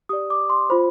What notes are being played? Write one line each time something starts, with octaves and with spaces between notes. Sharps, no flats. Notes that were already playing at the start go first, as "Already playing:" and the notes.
G4 D5 D#6
D6
C6
F4 C5 B5